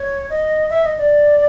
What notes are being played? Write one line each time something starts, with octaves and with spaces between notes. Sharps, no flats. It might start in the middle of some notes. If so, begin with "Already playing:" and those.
Already playing: C#5
D#5
E5
D#5
D5